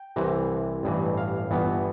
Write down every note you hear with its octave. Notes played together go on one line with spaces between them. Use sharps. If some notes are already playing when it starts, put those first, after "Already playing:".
Already playing: G5
C2 C3 E3
A1 G2 E3
F5
G1 G2 E3 B3